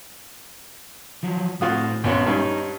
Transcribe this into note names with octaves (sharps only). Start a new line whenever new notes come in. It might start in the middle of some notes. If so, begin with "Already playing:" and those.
F3 F#3
A2 C4 F4 F#4 D#6
A#1 B3 C#4 F#4 B4 C6
G2 C#4 D#4